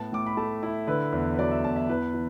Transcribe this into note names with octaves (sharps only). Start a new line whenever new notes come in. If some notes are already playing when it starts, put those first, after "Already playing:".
Already playing: A2 B3 A5
A2 D6
B5
A3 A5
E4
D3 B4
E2
B4
F#3 D5
E5
E2 A5
E5
E3 B4
E3